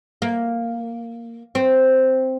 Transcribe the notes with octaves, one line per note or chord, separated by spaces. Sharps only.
A#3
C4